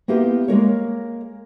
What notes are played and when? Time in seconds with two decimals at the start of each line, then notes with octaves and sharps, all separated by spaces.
0.08 A#3 B3 E4 G4 A#4 C5
0.48 G#3 A#3 A#4 C#5